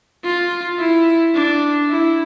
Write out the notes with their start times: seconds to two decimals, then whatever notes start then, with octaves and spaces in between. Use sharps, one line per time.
0.24 F4
0.79 E4
1.35 D4
1.90 E4